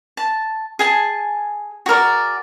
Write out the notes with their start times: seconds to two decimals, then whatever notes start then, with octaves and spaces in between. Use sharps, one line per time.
0.17 A5
0.79 G#4 G#5 A5
1.86 F#4 G#4 A#4 D5